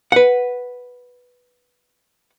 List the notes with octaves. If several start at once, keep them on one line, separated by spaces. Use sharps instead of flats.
B4 F#5